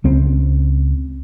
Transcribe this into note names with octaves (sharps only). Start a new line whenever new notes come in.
C#2 C4